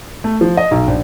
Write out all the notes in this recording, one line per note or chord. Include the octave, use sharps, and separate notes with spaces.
A3
F3
D#5
B1
A#1